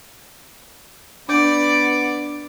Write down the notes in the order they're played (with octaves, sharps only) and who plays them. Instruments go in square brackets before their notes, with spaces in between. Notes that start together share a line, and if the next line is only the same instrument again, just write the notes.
[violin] B3 D5 [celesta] D4 D6 G6